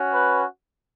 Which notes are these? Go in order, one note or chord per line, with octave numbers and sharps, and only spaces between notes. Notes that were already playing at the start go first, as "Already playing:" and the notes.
Already playing: C#4 F#4
B4